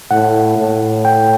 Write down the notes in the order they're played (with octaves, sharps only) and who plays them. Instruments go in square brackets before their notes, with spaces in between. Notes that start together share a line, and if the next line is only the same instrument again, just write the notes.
[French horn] A2 [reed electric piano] F#5
[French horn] A2
[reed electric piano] G5